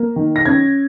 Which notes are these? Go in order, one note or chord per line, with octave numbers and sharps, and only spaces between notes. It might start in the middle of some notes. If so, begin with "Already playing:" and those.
Already playing: A#3
D#3
A#6
C#4 G#6